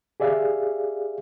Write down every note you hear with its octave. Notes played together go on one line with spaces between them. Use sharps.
G4 G#4 D5 E5 F5